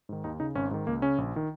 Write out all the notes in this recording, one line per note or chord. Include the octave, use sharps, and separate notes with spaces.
G#2 D#3
D#2 D#4
C#3 D#4
G#1 C#4
G#2 D#3
C#2 A#3
C#3 C#4
A#1
D#3